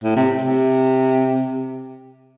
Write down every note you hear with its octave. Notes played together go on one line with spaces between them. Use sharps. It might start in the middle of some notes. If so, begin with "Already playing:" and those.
A2
C3
C3